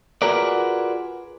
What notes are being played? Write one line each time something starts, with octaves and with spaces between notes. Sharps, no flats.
F4 F#4 G#4 A#4 B4 D5